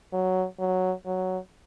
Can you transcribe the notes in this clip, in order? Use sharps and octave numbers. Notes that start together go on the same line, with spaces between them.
F#3
F#3
F#3